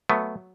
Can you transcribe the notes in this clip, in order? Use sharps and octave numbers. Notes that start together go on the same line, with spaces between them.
F#3 A3 B3